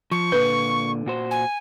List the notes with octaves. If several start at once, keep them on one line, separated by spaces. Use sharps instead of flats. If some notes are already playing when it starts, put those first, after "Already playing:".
F3 C#6
A#2 D3 B4
A#2 F#4 C5
G#5